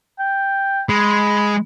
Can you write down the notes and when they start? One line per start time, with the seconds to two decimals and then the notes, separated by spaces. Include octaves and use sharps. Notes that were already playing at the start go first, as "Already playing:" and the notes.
0.19 G5
0.89 G#3 B5